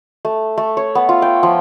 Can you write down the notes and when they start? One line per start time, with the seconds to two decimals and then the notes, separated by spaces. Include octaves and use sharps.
0.25 A3
0.58 A3
0.77 C#5
0.95 B3
1.09 F4
1.22 G5
1.43 F3